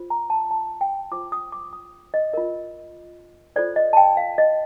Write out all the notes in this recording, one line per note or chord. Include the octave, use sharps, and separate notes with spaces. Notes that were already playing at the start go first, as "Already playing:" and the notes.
Already playing: F4 C5
A#5
A5
A5
G5
F4 C5 D6
D#6
D6
D#6
D#5
F4 A#4 D#5
F4 A4 C5 D5
D#5
A5
G5
F5
D#5